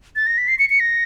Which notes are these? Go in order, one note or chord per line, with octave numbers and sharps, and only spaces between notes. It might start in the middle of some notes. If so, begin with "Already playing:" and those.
A6
A#6
B6
C7
C#7
C#7
A#6